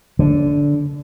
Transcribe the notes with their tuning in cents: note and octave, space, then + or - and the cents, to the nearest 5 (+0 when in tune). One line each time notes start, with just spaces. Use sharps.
D3 -15